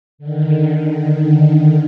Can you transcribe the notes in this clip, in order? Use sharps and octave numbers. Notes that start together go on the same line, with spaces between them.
D3 D#3